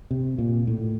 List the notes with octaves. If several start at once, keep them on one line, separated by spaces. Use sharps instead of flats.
C3
A#2
A2